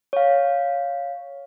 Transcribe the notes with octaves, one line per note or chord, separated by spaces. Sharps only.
C#5 F5